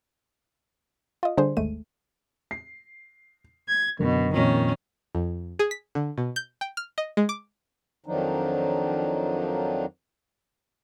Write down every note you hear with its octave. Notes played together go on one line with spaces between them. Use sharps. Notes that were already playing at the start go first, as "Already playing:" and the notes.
F4 D#5
D3 G3 D4 G#4 C5
G#1 D#2 G#3 A3 D#7
C7
G#6
F#1 B2 D3 A#4
F2 A#2 D#3 C#4
F2
G#4
B6
D3
B2
G6
G5
F6
D#5
G#3
D6
F2 D#3 F3 F#3 D4 D#4